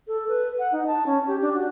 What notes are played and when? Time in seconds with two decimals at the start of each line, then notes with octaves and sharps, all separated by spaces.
0.08 A4
0.28 B4
0.59 F#5
0.72 D#4
0.87 A5
1.06 C#4
1.27 G4
1.42 D4
1.54 F#4